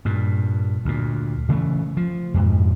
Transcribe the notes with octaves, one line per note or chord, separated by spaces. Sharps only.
G2 A#2
D2 A#2
C#3 E3 F#3 A3
F3
F2 G#2 B2